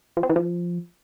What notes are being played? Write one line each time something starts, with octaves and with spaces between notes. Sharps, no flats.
F3
C4
E3
F3